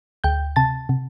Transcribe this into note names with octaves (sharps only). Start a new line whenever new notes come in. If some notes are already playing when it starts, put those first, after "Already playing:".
D2 G5 G6
C3 A5 A6
C3